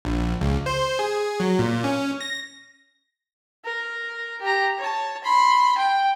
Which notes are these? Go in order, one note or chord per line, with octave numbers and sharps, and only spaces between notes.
A#1
C#2
C5
G#4
F#3
A#2
C#4
A#6
A#4
G4 A#5
C#5 A5
B5 C6
G5